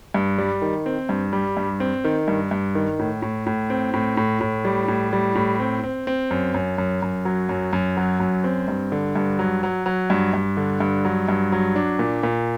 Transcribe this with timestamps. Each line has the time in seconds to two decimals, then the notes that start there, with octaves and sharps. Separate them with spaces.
0.14 G2
0.38 G3
0.62 D#3
0.86 C4
1.09 G2
1.33 G3
1.57 G2
1.80 C4
2.04 D#3
2.28 G2
2.51 G2
2.75 D#3
2.99 A2
3.22 A2
3.46 A2
3.70 C4
3.94 A2
4.17 A2
4.41 A2
4.65 G3
4.88 A2
5.13 G3
5.35 A2
5.60 C4
5.84 C4
6.07 C4
6.31 F#2
6.54 F#2
6.78 F#2
7.02 F#2
7.25 F#3
7.49 F#2
7.73 F#2
7.97 F#3
8.20 F#2
8.44 C4
8.68 G2
8.92 D3
9.16 G2
9.39 F#3
9.63 F#3
9.86 F#3
10.10 G2
10.34 G2
10.57 D3
10.80 G2
11.05 F#3
11.28 G2
11.52 F#3
11.76 D4
11.99 A#2
12.23 A#2